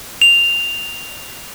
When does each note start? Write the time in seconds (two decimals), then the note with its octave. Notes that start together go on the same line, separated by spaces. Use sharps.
0.22 F7